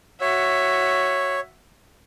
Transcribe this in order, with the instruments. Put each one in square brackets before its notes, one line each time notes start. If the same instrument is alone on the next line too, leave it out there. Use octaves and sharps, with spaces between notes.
[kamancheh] F#4 E5 [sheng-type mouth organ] C#5